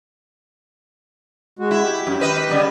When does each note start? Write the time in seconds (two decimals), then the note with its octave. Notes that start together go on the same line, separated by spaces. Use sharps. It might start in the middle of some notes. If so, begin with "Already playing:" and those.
1.59 G#3 F#4
1.71 E4
1.83 G4
2.07 F#2
2.20 D#3 B4 D#5
2.49 C#3 G3 B3